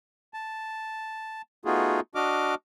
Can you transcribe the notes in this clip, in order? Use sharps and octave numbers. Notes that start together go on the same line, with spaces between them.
A5
A3 B3 D#4 F4 F#4 G#4
D4 F#4 D#5 D6 F6